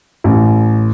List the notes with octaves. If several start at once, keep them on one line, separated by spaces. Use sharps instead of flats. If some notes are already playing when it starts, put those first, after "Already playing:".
A1